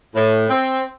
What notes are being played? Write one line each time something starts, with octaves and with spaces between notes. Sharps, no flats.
A2
C4